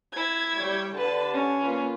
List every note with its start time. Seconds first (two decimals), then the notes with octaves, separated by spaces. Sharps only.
0.13 E4 G#6
0.58 G3 C#5 G5
0.97 D3 G4 B4 A5
1.32 C#4
1.62 A#3 F4 B4